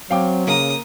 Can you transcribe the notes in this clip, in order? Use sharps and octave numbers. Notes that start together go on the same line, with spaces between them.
F#3 C4 F5 G5 D6
C#3 A#3 A#5 D#6